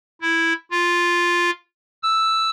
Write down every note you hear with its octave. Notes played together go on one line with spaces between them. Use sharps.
E4
F4
E6